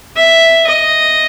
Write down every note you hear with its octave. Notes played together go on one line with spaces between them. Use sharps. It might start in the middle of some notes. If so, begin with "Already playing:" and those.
E5
D#5